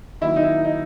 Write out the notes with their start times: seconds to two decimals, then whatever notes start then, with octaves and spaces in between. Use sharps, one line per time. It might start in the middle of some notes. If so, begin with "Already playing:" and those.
0.21 D#3 F#3 A#3 E4
0.36 D#4
0.43 E4
0.65 D#4